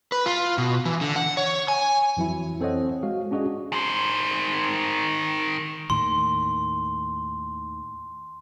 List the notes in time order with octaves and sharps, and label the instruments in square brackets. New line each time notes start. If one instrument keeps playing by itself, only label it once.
[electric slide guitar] B4
F4
B2
E3
D3
F#5
C#5
G#5
[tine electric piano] F2 E3 F#3 E4
C4 A4 C5 C#5 D#5 F#5
G#3 F#4 F5
C#4 D4 F#4 G#4 D#5
[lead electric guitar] D#3 C5
[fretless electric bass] D#2 A2 D#3 [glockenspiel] C6